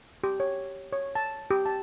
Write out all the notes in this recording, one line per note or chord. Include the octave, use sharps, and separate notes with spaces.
G4
C#5
C#5
A5
G4
A5